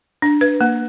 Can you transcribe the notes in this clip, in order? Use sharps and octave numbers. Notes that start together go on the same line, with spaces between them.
D4
B4
A#3